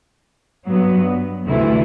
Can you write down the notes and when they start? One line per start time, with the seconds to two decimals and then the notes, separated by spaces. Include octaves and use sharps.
0.68 G2 F#3 B3
1.46 D2 C3 E3 A3 E4